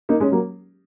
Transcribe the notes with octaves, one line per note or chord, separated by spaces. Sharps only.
A#3 D#4
G#3 C#4
F#3 A#3